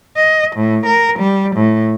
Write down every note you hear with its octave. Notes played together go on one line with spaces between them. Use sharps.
D#5
A2
A#4
G3
A2